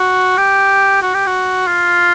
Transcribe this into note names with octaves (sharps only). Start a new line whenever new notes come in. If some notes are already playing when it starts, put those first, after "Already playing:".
Already playing: F#4
G4
F#4
G4
F#4
F4